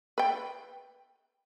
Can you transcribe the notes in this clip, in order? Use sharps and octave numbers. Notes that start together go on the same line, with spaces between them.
B4 G5